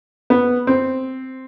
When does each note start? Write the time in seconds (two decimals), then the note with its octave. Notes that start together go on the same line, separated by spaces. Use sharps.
0.30 B3
0.67 C4